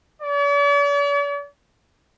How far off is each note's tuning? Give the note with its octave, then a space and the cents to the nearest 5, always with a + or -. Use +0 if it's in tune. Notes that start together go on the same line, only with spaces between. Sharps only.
D5 -45